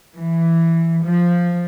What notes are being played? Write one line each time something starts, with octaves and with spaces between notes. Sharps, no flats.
E3
F3